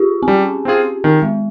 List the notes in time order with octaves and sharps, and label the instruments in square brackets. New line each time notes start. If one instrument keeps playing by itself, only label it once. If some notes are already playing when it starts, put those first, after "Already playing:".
Already playing: [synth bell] F4 G4 G#4
C4
[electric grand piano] G3 [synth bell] C#4
[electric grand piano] C4 F4 G#4
[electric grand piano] D#3 [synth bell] C4
[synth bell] G#3